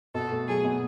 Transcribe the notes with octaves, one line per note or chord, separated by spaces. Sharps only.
B2 A4
A3
F#3 G#4
B2